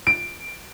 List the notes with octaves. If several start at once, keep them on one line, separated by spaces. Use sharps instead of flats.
D7